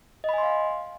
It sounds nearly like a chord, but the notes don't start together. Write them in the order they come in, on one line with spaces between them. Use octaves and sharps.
D#5 B5 G#5 C6 F5